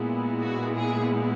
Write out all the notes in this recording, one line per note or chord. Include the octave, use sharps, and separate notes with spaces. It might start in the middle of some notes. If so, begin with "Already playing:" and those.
Already playing: A#2 G#3 B3 E4
F#4
G#4